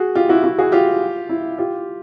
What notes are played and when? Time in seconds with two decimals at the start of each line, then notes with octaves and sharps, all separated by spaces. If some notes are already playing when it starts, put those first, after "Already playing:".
Already playing: F#4 G#4
0.15 F4 G4
0.29 E4 F#4
0.44 E4 F#4
0.58 F#4 G#4
0.72 F4 G4
1.29 E4
1.58 F4 G4